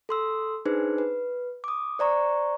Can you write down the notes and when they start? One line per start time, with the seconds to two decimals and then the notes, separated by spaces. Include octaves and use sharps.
0.09 A4 C6 E6
0.65 D4 D#4 G#4 B4 C5
0.98 B4
1.64 D6 D#6
1.99 C5 D5 A#5 C#6